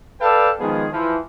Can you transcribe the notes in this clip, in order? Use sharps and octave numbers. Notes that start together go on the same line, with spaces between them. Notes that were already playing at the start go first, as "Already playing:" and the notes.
A4 B4 D5 F5 G5 A5
D#3 F3 G#3 B3 G#4
E3 F3